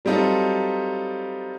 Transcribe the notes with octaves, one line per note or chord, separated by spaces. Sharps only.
F#3 G3 C4 D#4 F4 A4